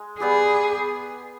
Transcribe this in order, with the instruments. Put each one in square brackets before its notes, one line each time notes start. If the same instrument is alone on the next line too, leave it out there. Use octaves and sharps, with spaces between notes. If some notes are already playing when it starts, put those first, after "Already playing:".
Already playing: [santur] G#3
[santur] G3 B3 G4 [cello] G#4